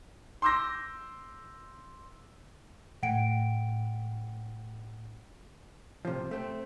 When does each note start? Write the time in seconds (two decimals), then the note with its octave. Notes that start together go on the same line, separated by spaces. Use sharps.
0.42 C6 D6 E6 G6 A#6
3.03 A2 F#5 G5 D7
6.05 C3 F3
6.31 A3 C4